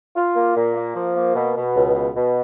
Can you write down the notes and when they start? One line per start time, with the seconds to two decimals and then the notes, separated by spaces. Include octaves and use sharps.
0.16 F4
0.35 A#3
0.56 A#2
0.75 A#3
0.95 F3
1.15 A#3
1.35 B2
1.55 B2
1.75 C#2
1.94 B2
2.15 B2